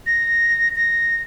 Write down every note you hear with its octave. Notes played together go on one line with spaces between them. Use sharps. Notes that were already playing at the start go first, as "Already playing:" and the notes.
A#6
A#6